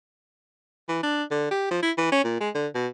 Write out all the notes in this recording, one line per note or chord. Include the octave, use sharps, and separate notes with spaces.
E3
D4
D3
G4
F3
E4
E3
C#4
A#2
G#3
D3
B2